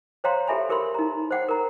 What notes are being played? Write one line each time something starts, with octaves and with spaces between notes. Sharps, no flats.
C5 C#5 F5 G5 A#5 C6
G4 A4 E5 G#5 B5
G4 A#4 B5 C6
D#4 A#5
C5 F#5 G5
A#4 A#5